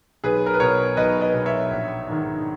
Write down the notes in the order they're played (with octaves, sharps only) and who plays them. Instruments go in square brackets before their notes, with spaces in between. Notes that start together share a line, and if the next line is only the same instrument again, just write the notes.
[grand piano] B1 G#4 B4
A#4
B4
B2 A#4 C#5
B1 B4 D#5
B4 D#5
B2
C#5 E5
A#1
G#2 D#3